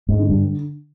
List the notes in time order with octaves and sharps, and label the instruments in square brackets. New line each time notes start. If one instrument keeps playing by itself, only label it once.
[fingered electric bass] G#2
[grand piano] D3
[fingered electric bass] G2